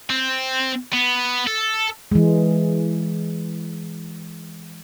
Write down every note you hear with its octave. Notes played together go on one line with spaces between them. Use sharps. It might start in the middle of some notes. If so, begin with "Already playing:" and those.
C4
B3
A4
E3 G#3